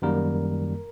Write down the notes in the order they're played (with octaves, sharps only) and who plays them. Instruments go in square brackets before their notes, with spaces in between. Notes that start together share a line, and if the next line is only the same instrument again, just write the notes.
[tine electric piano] F#2 D#3 G3 A#3 A#4